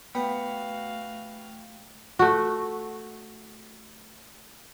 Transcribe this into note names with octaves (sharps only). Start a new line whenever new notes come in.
A3 B3 F#4 F5 G5
A3 F#4